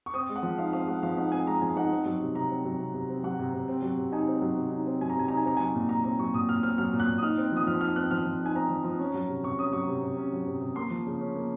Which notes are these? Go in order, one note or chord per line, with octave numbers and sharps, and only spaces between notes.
C#6
C4 D#6
G#3
F#5
F3
D#4 F5
C4 F5
G#3 F#5
F3 F5
D#4 F#5
C4 G#5
G#3 A#5
F3 G#5
D#4 F#5
C4
F#3
C3
C3 A#5
C4
F#3
C3
C3
C4
F#3 F#5
C3
C3
C4
F#3
C3
D#4 G#5
C4
F#3
C3
D#4
C4
F#3 G#5
A#5
C3 G#5
D#4 A#5
G#5
C4 A#5
F#3 G#5
A#2
A#2 A#5
C4 A#5
F#3 C#6
A#2 D#6
A#2 F6
C4 F6
F#3 F6
A#2
F#6
A#2
D#6
D#4 F6
C4
F3 D#6
F3 F6
D#4 F6
C4 F#6
F3 F6
F3
D#4 G#5
C4 A#5
F3
F3
C#4
F#3
C3
C3 C#6
C#4 D#6
F#3 C#6
C3
C3
C#4
F#3
C3
C3
A#3 C6
F3
C#3
C#4
A#3